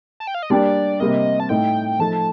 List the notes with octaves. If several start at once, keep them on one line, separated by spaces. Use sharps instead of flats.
A5
G5
F5
D#5
G3 A#3 D4 G4 D5
C3 G3 A#3 D#5
A5
A2 A3 D#4 G5
F3 A3 D#4 A4 A5